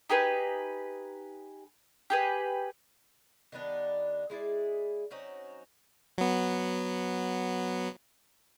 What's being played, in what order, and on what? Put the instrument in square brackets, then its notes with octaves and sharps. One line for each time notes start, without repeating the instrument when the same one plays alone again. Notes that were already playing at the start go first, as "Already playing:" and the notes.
[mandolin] D#4 G4 G#4 B4
G4 G#4 B4
[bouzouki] D#3 G3 B3 D4
G#3 E4 G#4 D5
F#3 C4 C#4 D#4
[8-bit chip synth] F#3 B3